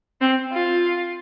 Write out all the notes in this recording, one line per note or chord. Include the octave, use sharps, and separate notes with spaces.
C4
F4